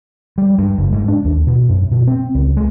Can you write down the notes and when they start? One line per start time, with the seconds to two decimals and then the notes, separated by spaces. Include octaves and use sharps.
0.38 G3
0.59 G2
0.78 F#1
0.93 G#2
1.08 D4
1.25 D#2
1.47 B2
1.69 F#2
1.91 B2
2.07 C4
2.35 C#2
2.57 G#3